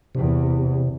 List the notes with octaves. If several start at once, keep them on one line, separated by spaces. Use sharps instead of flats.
E2 C3